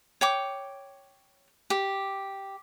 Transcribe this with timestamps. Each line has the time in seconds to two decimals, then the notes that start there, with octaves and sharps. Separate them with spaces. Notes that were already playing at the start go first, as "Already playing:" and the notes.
0.21 C#5 G5 D6
1.70 G4